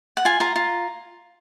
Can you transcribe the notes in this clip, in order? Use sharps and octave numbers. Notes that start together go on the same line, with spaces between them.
F#5
F4 G#5
F4 A#5
F4